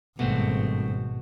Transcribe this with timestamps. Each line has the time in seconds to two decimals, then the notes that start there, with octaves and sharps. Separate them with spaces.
0.19 G#1 G2 B2 A3 C4